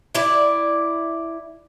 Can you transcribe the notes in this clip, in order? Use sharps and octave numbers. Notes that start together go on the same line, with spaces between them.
E4 D5